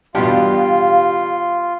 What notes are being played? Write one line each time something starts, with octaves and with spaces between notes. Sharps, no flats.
E2 G2 B2 G3 F4 G4 F5